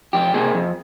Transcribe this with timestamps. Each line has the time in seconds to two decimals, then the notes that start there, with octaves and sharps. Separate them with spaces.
0.13 F2 G4
0.34 C3 F3 A#3 G#4
0.55 F2